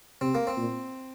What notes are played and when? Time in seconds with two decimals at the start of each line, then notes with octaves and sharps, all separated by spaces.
0.21 C3 C4
0.35 A#3
0.47 C4
0.57 A#2